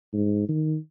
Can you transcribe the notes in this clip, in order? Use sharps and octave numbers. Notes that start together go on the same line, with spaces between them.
G#2
D#3